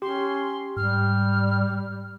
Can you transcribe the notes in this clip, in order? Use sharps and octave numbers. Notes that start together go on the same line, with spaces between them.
C#4 G4 C6
G#2 G3 F6